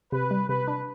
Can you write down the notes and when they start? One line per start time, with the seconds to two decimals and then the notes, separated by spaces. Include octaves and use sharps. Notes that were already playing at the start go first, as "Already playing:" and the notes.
0.12 C3 B4
0.31 G3
0.49 C3 B4
0.67 D4